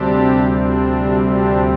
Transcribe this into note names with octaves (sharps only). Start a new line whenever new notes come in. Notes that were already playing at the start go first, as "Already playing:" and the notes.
Already playing: D2 C3 G3 C4 D4 G4
D4
D4